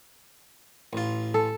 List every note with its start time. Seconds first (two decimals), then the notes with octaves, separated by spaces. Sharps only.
0.93 A1 F4
1.34 A4